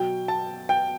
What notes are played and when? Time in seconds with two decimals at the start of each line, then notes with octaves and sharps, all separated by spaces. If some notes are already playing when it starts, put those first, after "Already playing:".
Already playing: B2 F#3 G5
0.28 A5
0.69 G5